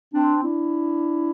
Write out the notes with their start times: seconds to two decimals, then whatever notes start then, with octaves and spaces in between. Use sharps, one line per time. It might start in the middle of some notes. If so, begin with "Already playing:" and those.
0.13 C4 D4
0.41 D4 E4